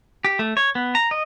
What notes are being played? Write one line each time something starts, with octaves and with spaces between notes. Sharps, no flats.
G4
A3
C#5
B3
A#5
D#5